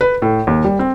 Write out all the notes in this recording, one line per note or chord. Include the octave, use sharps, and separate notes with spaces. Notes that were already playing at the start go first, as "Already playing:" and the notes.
B4
A2
D#2
G3
C4